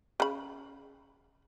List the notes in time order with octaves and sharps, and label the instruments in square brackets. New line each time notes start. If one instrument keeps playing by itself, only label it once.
[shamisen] C#3 B5